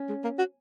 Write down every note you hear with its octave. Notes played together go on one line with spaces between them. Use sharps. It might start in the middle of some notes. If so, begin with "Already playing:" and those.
Already playing: C#4
G#3
A#3
F#4